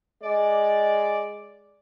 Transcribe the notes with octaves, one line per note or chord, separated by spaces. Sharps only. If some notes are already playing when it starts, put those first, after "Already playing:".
G#3 D5